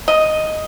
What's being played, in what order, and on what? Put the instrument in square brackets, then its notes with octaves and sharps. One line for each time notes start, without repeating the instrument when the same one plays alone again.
[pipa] D#5